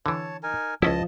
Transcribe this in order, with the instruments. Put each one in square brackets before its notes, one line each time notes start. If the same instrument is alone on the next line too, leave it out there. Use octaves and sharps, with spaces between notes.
[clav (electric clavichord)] D3 E3 [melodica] C#5 A5
[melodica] D#4 A#4 G#5
[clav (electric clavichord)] C#2 C#4 E4 [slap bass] F3 [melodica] D#5 A5 D#6